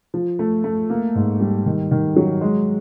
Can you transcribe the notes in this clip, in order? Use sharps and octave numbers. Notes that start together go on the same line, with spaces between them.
F3
A3
A3
A#3
G#2
G3
D#3
D#3
F#3
G#3